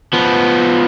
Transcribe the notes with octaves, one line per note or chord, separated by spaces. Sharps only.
F3 B3